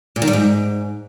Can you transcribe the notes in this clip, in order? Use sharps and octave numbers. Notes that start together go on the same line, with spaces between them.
A#2
D#3
G3
G#2